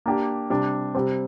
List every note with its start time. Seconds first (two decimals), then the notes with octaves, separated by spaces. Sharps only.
0.06 A#3 D4 G4
0.50 C3 G3 D4
0.95 C3 G3 C4